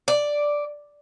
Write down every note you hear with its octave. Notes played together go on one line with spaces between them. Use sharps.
D5